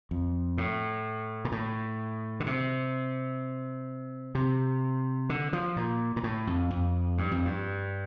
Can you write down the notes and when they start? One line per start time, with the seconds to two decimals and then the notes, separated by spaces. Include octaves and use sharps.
0.11 F2
0.58 A2
1.45 A#2
1.52 A2
2.40 D3
2.46 C3
4.35 C3
5.29 D3
5.53 F3
5.76 A#2
6.16 A#2
6.24 A2
6.47 F2
6.71 F2
7.18 G2
7.31 F2
7.45 G2